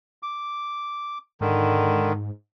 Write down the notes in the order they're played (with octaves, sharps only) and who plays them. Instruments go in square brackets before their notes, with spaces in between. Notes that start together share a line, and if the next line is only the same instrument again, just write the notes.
[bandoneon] D6
[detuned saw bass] G#2 [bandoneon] D3 D#3